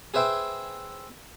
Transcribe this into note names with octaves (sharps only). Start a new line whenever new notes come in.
G#4 B4 C5 E5 G5